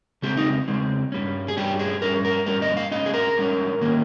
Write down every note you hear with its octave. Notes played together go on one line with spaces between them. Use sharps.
C#3 G#3 C4 G4
D#4
C#3 G#3 C4
G2 G3 C#4
G#4
G2 G3 C#4 G4
G#4
G2 G3 C#4 A#4
A#4
G2 G3 C#4 A#4
D#5
F5
G#2 G3 C#4 D#5
G#4
A#4
G#2 G3 C#4
D#3 A#3 C#4